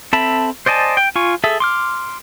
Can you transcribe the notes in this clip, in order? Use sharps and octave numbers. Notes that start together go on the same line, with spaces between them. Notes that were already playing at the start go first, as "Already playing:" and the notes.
C4 A4 E5 A5 B5
C5 D5 D#5 G#5 A5
G5
F4 G#5 C#6
G#4 A4 E5
C6 D6 F6